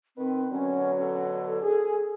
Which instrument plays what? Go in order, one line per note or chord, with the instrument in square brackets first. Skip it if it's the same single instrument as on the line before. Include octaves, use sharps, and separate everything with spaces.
[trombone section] D#3 B4 [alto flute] C4
[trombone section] B2 D3 F#3 [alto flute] C#4
[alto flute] A4
[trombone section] G#4